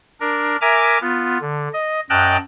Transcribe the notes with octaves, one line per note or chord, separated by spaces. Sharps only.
D4 A#4
A#4 E5 G#5 A#5 D6
B3 F4
D3
D#5
F#2 D#5 G5 A5 F6 F#6